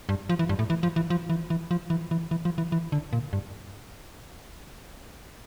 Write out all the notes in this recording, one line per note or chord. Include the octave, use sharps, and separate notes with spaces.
G2
F3
E3
G2
A2
E3
F3
E3
F3
E3
E3
F3
E3
E3
E3
F3
E3
E3
D3
A#2
G2